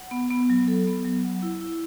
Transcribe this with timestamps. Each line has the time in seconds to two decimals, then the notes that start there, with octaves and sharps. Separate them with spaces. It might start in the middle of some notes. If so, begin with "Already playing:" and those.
Already playing: F#5
0.11 B3
0.31 B3
0.50 F#3
0.68 A4
0.87 B3
1.05 F#3
1.24 F#5
1.42 E4
1.61 E4